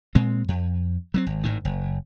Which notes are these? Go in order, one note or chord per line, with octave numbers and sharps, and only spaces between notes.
A#2 G#3 C4
F2
F#3 A3 C4
G#1
G#1 A2 D#3
F#1